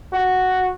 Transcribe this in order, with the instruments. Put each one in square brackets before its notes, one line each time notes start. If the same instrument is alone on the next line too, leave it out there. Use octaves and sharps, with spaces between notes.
[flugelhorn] F#4